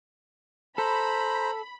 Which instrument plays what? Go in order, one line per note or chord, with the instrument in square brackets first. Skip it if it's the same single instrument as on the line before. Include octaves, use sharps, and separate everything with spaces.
[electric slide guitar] A4 [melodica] C5 A#5 [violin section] B5